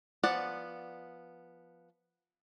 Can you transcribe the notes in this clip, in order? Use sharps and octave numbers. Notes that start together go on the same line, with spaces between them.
F3 B3 D5 F#5